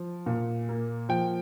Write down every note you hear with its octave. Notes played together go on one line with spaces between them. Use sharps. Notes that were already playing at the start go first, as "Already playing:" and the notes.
Already playing: F3
A#2
A#3
F3 G5